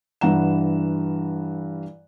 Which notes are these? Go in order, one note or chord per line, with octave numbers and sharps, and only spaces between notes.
G2 E3 F#5 A#5 E7